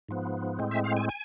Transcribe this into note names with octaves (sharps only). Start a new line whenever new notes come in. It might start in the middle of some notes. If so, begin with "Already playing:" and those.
G#2 F3 B3
A2 G#3 C4
E5
F5
G#5
G#5